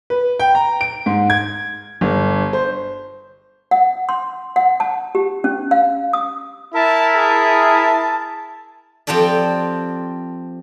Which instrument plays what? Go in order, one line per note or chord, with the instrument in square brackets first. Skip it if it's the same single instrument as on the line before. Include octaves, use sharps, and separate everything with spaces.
[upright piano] B4
G5
A#5
D7
G#2
G#6
G1
C5
[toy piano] F#5
C6
F#5
A5
G4
C#4
F5
D#6
[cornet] E4 [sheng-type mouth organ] A#4 E5 [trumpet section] A5
[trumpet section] G#4 [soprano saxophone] A5
[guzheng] F3 C4 G4 A4 D5